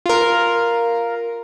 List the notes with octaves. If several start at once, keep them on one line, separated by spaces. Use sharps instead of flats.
F4 A#4